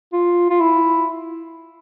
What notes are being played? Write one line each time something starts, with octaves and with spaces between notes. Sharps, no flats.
F4
F4
E4